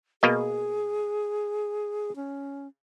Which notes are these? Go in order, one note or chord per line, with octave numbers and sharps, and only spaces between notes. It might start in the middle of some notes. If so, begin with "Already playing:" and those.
B2 A#3 G#4 D#5
C#4